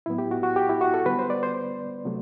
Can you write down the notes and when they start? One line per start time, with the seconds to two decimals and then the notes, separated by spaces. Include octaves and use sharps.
0.06 A2 F#3 B3 E4
0.18 G4
0.31 F#4
0.43 F#4
0.56 G4
0.69 E4
0.81 F#4
0.94 A4
1.05 D3 G3 B3 B4
1.19 C5
1.30 D5
1.43 C5
2.05 C3 F#3 A3